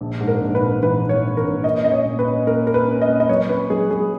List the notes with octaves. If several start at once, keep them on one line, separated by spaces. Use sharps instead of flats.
A#1
G#2
A#4
A#1
B4
A#1
E3 B4
A#1
C#5
E3
A#4
A#1
A#2 D#5
C#4 D#5
C#5
A#2
B4
C#4
A#3 A#4
A#3 A#4
B4
C#4
D#5
A#3
D#5
F#3 C#5
C#4 B4
F#3 G#4
F#3 G#4